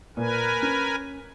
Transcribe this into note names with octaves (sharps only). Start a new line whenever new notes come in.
A#2 A#4 B4 G#5
C#4